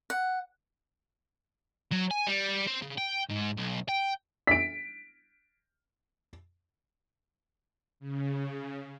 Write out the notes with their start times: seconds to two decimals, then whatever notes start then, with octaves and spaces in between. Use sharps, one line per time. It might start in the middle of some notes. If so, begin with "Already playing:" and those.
0.10 F#5
1.92 F#3
2.11 G#5
2.27 G3
2.67 C4
2.82 C#3
2.98 G5
3.30 G#2
3.58 B1
3.89 G5
4.47 B6 D7
8.00 C#3